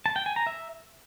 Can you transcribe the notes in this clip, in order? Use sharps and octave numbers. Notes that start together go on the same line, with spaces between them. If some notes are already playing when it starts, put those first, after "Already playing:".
A5
G5
G#5
A#5
E5